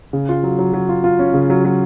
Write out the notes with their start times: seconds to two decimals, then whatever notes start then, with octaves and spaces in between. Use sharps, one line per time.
0.13 C#3
0.29 F4
0.43 F#3
0.59 F#3
0.73 F#3
0.89 F4
1.04 F4
1.19 C#4
1.34 C#3
1.50 F#3
1.65 F#3